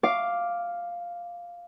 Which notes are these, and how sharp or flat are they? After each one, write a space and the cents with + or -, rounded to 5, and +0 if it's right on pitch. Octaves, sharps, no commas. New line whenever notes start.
F5 +0 D6 +0